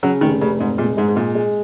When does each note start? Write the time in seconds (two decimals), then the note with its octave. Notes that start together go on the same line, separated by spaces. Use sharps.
0.03 C#3 F#3
0.21 F1 D#3
0.41 F1 C#3
0.60 F1 G#2
0.78 A#2 G#3
0.97 G#2 G#3
1.08 G#2
1.16 A#2 G#3
1.35 G#3